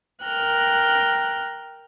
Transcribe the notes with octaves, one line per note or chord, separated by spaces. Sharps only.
A#4 G5 F6 F#6